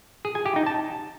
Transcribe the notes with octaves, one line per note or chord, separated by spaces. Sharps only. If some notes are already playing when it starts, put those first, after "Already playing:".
G#4
G#5
G4
D#4
A5